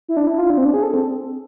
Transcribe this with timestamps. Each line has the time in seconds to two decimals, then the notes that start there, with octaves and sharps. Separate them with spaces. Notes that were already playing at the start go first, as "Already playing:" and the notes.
0.09 E4
0.17 D4
0.27 E4
0.38 F4
0.50 D4
0.58 C4
0.65 D4
0.74 G#4
0.83 A4
0.94 C4